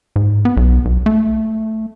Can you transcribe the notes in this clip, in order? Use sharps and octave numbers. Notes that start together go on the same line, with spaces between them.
G#2
B3
B1
B1
A3